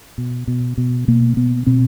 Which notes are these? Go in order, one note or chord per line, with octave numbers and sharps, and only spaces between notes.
B2
B2
B2
B2 A#3
B2 B3
B2 C4